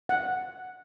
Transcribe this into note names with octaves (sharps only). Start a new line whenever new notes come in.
F#5